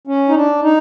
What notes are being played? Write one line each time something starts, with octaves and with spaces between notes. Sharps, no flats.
C#4
D#4
D4
D#4